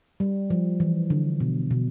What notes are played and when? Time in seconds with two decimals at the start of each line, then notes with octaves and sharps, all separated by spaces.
0.20 G3
0.50 F3
0.80 E3
1.10 D3
1.40 B2
1.71 B2